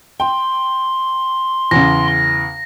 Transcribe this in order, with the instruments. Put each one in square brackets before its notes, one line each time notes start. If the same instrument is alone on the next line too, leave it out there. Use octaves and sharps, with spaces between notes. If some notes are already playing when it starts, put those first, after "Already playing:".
[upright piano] G5 [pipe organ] C6
[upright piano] E2 C#3 [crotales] A#6